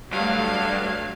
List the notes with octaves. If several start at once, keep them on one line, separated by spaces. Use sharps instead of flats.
G2 F#3 A3 F5